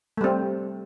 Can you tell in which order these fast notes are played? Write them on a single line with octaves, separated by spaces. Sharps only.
A3 G3 C4